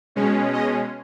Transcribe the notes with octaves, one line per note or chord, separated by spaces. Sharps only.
B2 G#3 C#4
D#5